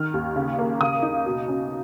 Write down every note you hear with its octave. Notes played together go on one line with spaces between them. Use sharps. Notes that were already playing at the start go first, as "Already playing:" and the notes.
Already playing: D#3 F6
D#2
C#3
A#3
C#3 D#6
D#4
B2
C#4